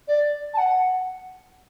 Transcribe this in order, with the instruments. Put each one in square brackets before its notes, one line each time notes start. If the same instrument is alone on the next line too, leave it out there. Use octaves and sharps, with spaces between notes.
[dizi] D5
A5
F#5